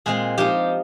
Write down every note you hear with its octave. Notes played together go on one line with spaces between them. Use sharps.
A#2 G#3 C4 G#4
F3 C4 D#4 G4